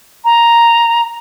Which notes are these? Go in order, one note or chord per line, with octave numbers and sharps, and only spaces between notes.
A#5